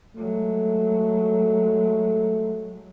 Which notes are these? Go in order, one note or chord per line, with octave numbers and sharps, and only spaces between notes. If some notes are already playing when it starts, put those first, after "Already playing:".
F#3 G#3 A3